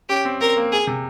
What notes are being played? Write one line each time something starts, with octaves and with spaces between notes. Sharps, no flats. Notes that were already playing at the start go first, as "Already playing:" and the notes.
C#4 G4
C4
C4 A#4
A#3
G#4
C3